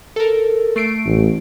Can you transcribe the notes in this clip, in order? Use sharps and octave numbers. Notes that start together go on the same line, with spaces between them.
A4 A#4
A3 C7 D7
A1